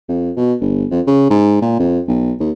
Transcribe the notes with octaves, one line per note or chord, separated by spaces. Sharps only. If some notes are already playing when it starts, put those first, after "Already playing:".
F2
B2
G1
F2
C#3
G#2
A#2
F2
B1
D#2